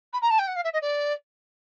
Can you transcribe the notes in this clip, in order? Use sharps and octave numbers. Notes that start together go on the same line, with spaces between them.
B5
A#5
A5
G5
F#5
F5
E5
D#5
D5